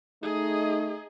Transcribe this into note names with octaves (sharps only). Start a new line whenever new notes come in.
A3 D#4 G#4 D#5